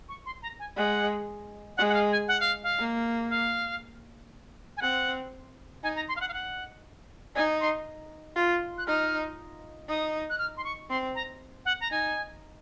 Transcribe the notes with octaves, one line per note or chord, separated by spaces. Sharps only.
C#6
C6
A#5
G#5
G#3 F#5
G#3 F#5
F#5
F5
G#5
F#5
F5
F5
A#3
F5
G#5
C4 F#5
D#4 G#5
A#5
C6
F5
F#5
F5
F#5
D#4 G#5
C6
F4
F#6
D#4 F6
D#4 D#6
F#6
F6
C6
C#6
C4 C6
A#5
F#5
A#5
D#4 G#5